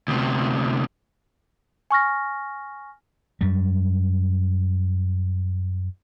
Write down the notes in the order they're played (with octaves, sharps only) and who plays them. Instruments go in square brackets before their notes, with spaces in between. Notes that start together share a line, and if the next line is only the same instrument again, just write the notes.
[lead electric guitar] D2 C3
[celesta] G#5 C#6 F6 A#6
[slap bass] F#2 G3